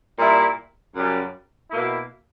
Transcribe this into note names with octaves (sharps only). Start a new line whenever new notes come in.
A#2 G3 A#3 E4
F#2 C#3 G3
B2 A#3 E4